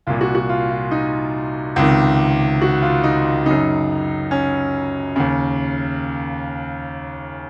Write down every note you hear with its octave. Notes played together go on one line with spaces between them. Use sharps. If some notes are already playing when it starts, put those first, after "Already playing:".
C2 A#2 F4
F#4
F#4
F4
F4
D#4
C#2 C3 D#3
F#4
F4
D#4
F#2 C#3 D#4
C#4
D#2 C#3